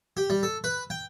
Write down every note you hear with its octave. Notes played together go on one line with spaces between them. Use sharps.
G4
G3
A4
B4
G5